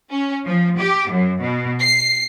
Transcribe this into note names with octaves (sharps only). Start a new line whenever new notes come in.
C#4
F3
G4
F#2
B2
C7